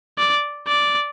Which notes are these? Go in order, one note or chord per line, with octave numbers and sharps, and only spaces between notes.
D5
D5